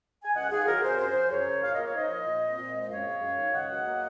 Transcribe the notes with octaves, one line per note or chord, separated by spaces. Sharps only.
G#5
C#2 D#5 F#5
D#3 F4 G#4
F#3 F#4 A#4
C3 G#4 C5
F#2 G#4 C5
F3
F#2 A#4 C#5
C#3
A#2 F5
A#3 D#5
C#5
D#4 C5 D#5
F3
A#2
C4
A#2
G#3
D#5
F#2 C#5 F5
G#3
F#2
D#3
C#2 D#5 F#5
F#3
A#3